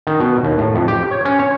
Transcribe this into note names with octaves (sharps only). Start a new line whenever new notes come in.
D#3
B2
D#2
A2
F2
G4
C#5
C#4
C#5